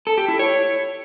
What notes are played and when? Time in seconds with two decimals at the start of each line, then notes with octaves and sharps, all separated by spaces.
0.07 A4
0.18 G4
0.28 E4
0.39 C#5